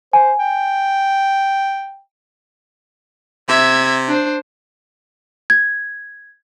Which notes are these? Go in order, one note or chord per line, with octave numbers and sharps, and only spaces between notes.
C5 G#5
G5
C3 E5 G#6
D4 C5
G#6